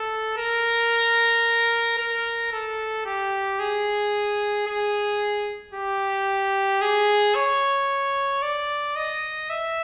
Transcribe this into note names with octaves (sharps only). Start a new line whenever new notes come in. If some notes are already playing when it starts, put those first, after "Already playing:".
Already playing: A4
A#4
A#4
A4
G4
G#4
G#4
G4
G#4
C#5
D5
D#5
E5